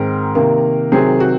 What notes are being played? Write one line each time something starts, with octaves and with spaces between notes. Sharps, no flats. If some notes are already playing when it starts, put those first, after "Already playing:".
Already playing: G#2 D#3 G#3 C4 A#4
C3 D#3 A#3
C3 D#3 F#3 C4 G#4
F#4